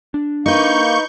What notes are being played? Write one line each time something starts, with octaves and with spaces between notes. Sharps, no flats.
D4
A#3 D#4 B4 C#6 G6